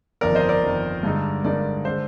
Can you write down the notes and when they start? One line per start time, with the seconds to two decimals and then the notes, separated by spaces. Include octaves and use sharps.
0.21 G1 F2 D#3 A#4 D5
0.35 C5 D#5
0.49 A#4 D5
0.63 G1 F2 D#3
1.03 G2 D3 G#3 D#4
1.44 G2 D3 G#3 D#4 A#4 D5
1.85 D3 G#3 C5